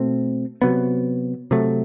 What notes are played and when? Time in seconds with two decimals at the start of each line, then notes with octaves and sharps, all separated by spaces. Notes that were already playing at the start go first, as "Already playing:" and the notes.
Already playing: B2 A3 C4
0.62 C3 F#3 B3
1.51 C3 F#3 A3